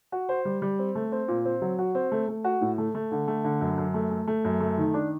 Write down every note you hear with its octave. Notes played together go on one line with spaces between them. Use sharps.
F#4
C5
G3
G3
C4
A3
C4
A#2
C4
F#3
F#4
C4
A3
A3
F#4
A2
A3
A3
D3
A3
D3
F#2
F#2
A3
A3
A3
F#2
A3
D#3
D4